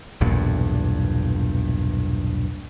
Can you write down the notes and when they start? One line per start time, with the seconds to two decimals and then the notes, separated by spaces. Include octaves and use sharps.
0.21 B1 E2 G2 A#2